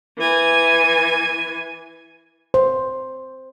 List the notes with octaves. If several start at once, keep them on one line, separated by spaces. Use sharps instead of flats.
E3 G#5
C5